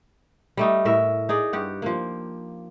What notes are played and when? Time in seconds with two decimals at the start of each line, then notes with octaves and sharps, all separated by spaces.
0.57 G3 A3 D#4
0.85 A2 A#4 E5
1.29 D#4 G#4 D5
1.53 G2 G4 F#5
1.82 F3 A#3